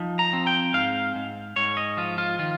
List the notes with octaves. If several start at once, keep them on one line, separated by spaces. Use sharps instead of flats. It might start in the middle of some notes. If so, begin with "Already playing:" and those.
Already playing: F3 D#4
A#5
C4
G5
G#2 F5
G#2
G#2 C#5
D#5
F3 F4
F4
D#3 F4